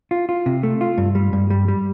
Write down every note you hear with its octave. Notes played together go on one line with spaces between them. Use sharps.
F4
F4
C3
A3
F4
G2
G3
G2
G3
G3